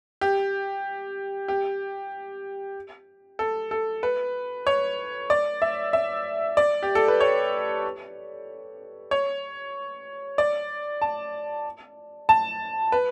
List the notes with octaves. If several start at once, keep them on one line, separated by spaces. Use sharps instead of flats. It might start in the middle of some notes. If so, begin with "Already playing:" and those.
G4
G4
A4
A4
B4
C#5
D5
E5
E5
D5
G4
A4
B4
C#5
C#5
D5
A5
A5
B4